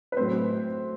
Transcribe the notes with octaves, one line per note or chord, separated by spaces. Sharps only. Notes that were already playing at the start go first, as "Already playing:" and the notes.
B4
A2 F#3 A3 C4 C5